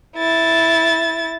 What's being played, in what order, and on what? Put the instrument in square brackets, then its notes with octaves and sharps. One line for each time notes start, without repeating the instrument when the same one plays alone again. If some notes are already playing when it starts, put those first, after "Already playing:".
[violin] E4 A6